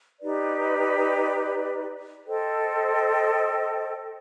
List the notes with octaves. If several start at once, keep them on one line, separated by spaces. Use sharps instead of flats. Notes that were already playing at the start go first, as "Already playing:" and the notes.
D#4 G4 B4 D5
A4 C5 D#5 G5